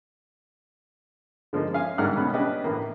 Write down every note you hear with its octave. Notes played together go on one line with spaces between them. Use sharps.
D3 F3 G#3 A#3 D#4
C#4 F5 G#5
G#2 D3 G3 A#3 F#5 F6
B2 D#3 B3 C#4
C#4 D4 G4 B4 D#5
A2 E3 A#3